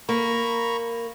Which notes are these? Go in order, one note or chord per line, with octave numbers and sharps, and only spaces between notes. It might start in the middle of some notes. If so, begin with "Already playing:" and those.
A#3 A#5 B5 C#6